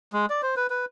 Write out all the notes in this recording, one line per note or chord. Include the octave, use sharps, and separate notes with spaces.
G#3
D5
C5
B4
B4